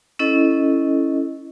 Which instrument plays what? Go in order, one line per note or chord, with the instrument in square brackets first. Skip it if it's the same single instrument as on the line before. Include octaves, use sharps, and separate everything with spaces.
[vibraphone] C#4 E4 A4 D#5